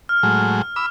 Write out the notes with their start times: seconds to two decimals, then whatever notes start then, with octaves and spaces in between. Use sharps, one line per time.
0.09 F6
0.23 A2 F#3 G#3
0.76 B5 D6 E6